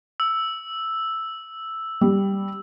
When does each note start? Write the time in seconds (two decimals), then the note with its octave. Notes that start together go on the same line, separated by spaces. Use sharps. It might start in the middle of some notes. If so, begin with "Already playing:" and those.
0.20 E6
2.01 G3